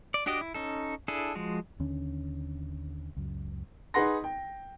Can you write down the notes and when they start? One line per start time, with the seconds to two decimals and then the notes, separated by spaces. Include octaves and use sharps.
0.14 D5
0.26 D4 F#4 G4 D5 D#5
0.41 E4
0.54 C#4 D#4 A4
1.08 D4 E4 G#4 A4
1.35 F3 G#3 F#4
1.80 D#2 D3 C#4
3.16 C#2 F#2
3.94 D#4 G#4 B4 F#5 C6 A#6
4.24 G5